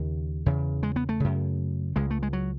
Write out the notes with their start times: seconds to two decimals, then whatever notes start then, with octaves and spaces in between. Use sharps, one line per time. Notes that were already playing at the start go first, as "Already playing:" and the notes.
Already playing: D#2 C#3
0.46 E2 C#3
0.83 G#3
0.96 B3
1.09 A3
1.20 F#2 C#3
1.96 C#2 C#3 G#3
2.11 A3
2.23 G#3
2.33 F#3